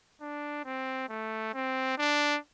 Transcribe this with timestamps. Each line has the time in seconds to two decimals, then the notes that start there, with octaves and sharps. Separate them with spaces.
0.21 D4
0.65 C4
1.09 A3
1.54 C4
1.98 D4